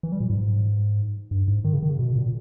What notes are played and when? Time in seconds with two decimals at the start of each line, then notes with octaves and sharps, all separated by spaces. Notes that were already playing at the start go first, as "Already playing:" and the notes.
0.03 E3
0.12 G3
0.21 A#2
0.30 G#2
1.31 G2
1.48 G#2
1.64 D#3
1.73 C#3
1.83 D#3
1.90 C#3
1.99 B2
2.16 A#2